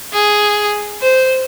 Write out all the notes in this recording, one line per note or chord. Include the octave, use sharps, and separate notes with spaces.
G#4
C5